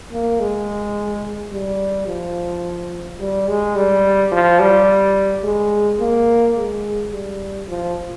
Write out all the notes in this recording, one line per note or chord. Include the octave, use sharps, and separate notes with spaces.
A#3
G#3
G3
F3
G3
G#3
G3
F3
G3
G#3
A#3
G#3
G3
F3